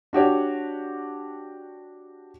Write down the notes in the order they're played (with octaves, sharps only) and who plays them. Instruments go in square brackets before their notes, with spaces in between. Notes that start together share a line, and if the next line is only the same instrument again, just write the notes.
[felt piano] D4 F#4 G4 C#5